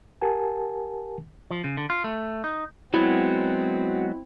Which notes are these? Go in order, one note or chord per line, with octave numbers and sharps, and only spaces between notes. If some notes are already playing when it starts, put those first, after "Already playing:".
G4 A#4 F#5 G#5 A5
F3
C#3
D3
F4
A3
D#4
F#3 G#3 B3 C4 E4 F#4 C#5